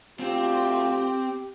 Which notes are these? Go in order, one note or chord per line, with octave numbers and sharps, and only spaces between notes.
D2 A3 C4 F4 G4